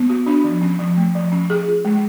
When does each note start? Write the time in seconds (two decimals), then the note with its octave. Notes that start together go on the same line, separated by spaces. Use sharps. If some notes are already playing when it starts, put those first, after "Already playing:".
Already playing: B3
0.10 F#4
0.27 D4
0.44 F3
0.62 C#4
0.79 F3
0.96 A3
1.15 F3
1.32 C#4
1.50 G#4
1.67 F4
1.85 G#3